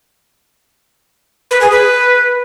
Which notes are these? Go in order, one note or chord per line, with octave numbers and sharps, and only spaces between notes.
B4
G#4
B4